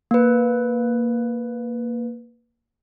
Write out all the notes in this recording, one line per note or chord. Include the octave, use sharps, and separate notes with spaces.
A#3 B4